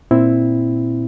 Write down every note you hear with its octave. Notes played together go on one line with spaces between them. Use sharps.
A#2 C4 E4